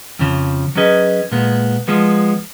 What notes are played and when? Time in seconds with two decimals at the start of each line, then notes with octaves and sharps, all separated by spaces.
0.19 F2 C#3 F3
0.75 F#3 C#4 G#4 B4 D#5
1.32 A#2 G#3 B3
1.88 F3 G#3 B3